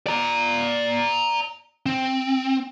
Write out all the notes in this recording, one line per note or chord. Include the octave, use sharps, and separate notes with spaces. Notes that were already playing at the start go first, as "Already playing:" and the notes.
D5 A#5
C4